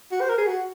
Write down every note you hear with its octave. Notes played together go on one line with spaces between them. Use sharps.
F#4
C5
A#4
G#4
F#4